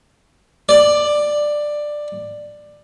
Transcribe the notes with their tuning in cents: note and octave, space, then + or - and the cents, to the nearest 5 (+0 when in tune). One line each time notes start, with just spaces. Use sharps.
D5 +10